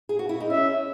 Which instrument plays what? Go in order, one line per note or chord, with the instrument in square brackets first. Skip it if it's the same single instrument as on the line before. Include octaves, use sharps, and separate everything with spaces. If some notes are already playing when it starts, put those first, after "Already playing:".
[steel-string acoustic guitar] G#4
F#4
E4
D#4
[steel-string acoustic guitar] C#4 [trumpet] E5